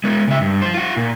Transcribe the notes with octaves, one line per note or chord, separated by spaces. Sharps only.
G#3 B3
C#3 E5
G2
F3 C5
F4 F#5
A#2